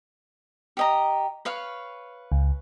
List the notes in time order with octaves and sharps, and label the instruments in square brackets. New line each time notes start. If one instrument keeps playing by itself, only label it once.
[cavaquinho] G4 D#5 A#5
B4 C#5 F5
[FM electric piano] C#2